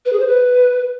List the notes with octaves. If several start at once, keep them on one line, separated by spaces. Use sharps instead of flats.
B4
G#4
C5
B4